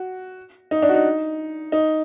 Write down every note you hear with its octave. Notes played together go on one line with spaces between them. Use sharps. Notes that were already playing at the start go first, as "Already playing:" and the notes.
Already playing: F#4
D#4
D4
F#4
D#4
D#4